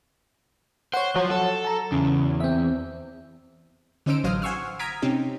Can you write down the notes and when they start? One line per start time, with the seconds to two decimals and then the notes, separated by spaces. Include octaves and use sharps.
0.94 C5 C#5 F#5
1.16 F3 F#3
1.30 A4
1.65 A5 A#5
1.92 E2 C#3
2.40 C4 E5
4.06 D3 C#4 D#4 C5 E6 D7
4.24 A1 F#3 C5 F5 D#6 F6
4.42 F#5 G#5 C6 C#6 E6 F6
4.79 A#5 D#6 F6 G#6 B6 D7
5.02 C3 C4 C#4 D#4 G4